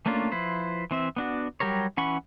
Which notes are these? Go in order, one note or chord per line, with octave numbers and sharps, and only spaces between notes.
A3 A#3 C#4 D4 F4
F3 E4 B4 C5
E3 C4 E5
B3 D4 F#4
F#3 G3 G4 A#4 C#5
E3 C#4 F#5 B5 C#6